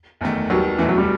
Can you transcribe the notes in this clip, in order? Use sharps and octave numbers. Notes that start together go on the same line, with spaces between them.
F#1 E2 D#3 A3
D#2 D#3 F#3 G3 B3
F#1 E2 B2 E3 A3
F#3
G3